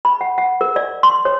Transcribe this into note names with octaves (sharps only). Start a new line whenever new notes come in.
B5
F#5
F#5
A#4
D5
C6
C#5